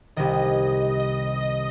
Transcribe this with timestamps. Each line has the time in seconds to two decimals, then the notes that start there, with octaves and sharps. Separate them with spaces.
0.16 C2 C3 D#3 D#5
1.00 D#5
1.41 D#5